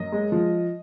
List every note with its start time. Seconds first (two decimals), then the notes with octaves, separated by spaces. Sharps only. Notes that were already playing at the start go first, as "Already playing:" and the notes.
Already playing: F#2 D#5
0.12 G#3
0.32 F3